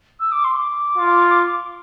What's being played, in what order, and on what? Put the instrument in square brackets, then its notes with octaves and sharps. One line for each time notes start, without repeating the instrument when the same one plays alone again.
[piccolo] E6
D6
C6
D6
[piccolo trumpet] F4